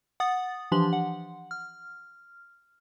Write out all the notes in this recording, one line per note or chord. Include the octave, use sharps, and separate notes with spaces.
F#5 D#6 A6
E3 F3 D4 G4 C6 F#7
F#5
F6